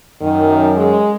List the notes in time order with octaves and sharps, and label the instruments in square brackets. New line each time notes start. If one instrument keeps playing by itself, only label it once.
[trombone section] F#2 [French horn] D#3
[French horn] G#3